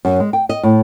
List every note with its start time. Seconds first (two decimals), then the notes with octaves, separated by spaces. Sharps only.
0.05 F#2
0.20 G#3
0.33 G5
0.49 D#5
0.63 A2